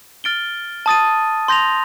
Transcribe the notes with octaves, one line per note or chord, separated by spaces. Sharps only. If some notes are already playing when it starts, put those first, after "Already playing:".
F6 A6 D7 G7
A5 D#6 A6 D#7
C6 G6 A#6 F7